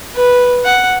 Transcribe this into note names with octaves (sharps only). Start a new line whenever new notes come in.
B4
F#5